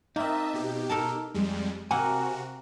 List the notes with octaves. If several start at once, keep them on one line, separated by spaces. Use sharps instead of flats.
A#3 C4 D#4 D#5 E5 A5
B2 G4
A4 A#4 A5
F2 G3 G#3
C3 A#3 C4 F#4 F#5 G#5